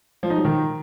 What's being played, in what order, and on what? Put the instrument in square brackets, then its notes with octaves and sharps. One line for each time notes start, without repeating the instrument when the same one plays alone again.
[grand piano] F3
D#4
F#3
D#3